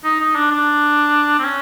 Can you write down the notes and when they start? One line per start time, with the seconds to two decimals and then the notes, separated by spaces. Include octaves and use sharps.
0.04 D#4
0.20 D#4
0.35 D4
0.51 D4
1.39 C4
1.44 C#4